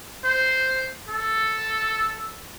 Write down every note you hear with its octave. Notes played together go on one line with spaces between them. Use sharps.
C5
A4